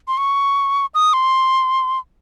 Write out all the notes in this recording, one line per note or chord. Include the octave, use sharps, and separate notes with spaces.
C6
C#6
D#6
C6